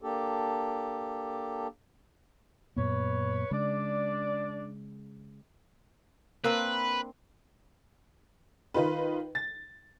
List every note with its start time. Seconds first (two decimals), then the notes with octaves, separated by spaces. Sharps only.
0.02 A#3 D4 G4 A4
2.76 F#2 A#2 B3 B4 C#5
3.51 C#3 G#3 D4 D5
6.44 A#3 C4 D4 B4
8.74 D#3 D#4 F4 B4
9.35 A6